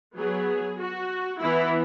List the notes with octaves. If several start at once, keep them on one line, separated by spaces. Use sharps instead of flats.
F#3 B3 G#4
F#4
E3 B3 E4